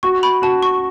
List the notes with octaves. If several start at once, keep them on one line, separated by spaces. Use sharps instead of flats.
F#4 C#6
B5
F#4 A5
C#6